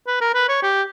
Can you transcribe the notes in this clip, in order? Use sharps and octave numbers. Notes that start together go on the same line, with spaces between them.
B4
A#4
B4
C#5
G4